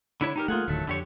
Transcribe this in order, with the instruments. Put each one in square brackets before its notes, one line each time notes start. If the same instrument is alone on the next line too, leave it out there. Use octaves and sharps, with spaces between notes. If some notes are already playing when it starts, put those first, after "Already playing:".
[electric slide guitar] D3 E4 C#5
D#4 G4 A#4
[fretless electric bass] A3 A#3 [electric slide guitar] F4 G#4 F#5
[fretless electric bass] D1 D2 D#3 [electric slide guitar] F#3 A3
[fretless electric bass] F2 [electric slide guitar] D3 G4 C#5